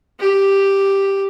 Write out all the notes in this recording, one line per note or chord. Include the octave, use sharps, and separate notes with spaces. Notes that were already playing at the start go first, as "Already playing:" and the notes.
G4